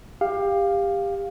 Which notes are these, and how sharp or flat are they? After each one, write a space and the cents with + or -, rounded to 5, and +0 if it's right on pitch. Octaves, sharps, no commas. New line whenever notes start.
G4 +20 F5 +5